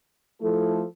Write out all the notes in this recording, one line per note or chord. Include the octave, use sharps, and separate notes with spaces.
F3 A3 E4 A4